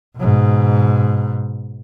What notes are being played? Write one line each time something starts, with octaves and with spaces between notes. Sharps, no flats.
G#2 B2